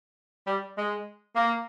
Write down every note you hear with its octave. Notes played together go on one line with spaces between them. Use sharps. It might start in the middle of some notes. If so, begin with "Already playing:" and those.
G3
G#3
A#3